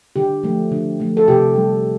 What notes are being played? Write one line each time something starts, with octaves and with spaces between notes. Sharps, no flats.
D3 G4
F3 A3
D3
F3 A3
A4
C3 G4
G3